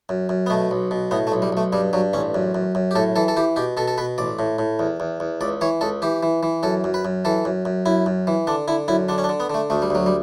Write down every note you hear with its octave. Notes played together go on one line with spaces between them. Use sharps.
F#2
F#2
B3
B2 A3
B1
B2
A2 B3
A3
B1
G3
B1 A3
G2 G3
G2 F#3
A1 C#4
F#2
F#2
F#2
G4
A2 A4
E3 A4
A4
E3 G4
B2 G4
B2 A4
A4
B2 B4
A1 D5
A2
A2
E2
E2
E2
C#2 D5
E3 C#5
C#2 A4
E3 G4
E3
E3
F#2 A4
F#2
B4
F#2
E3 A4
F#2
F#2
F#2 E4
F#2
E3
D3 D4
D3 E4
F#2 E4
D3 D4
C#4
D4
D3
B3
D3 A3
D2 A3
G3
D2 F#3
G3